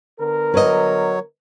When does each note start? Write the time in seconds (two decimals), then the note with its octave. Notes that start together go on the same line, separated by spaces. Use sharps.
0.19 D3 B3 A#4
0.54 F#3 B4 C#5 D#5